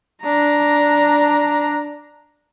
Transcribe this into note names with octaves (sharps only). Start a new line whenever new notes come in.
D4 A#5